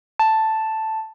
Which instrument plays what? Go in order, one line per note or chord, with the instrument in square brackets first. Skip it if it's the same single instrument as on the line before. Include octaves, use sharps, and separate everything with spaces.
[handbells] A5